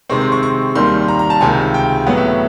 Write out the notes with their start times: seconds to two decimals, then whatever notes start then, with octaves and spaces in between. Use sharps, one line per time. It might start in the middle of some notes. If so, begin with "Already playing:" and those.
0.10 C3 D#3 G#3 C4 C#6
0.21 C6
0.32 C#6
0.43 C#6
0.75 D#2 D#3 G3 C6
1.08 A#5
1.19 A#5
1.30 A5
1.41 C#2 C3 D#3 G#5
1.74 G5
2.07 A2 F#3 B3 F#5
2.17 E5